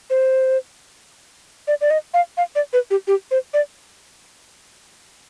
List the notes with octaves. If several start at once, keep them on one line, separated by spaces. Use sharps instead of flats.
C5
D5
D5
D#5
F5
F5
D5
B4
G4
G4
C5
D5